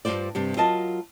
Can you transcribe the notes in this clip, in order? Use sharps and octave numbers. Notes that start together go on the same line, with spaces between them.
G2 B2 F4 C5 D5
G2 C3 G3
F#3 F4 A#4 D#5 A5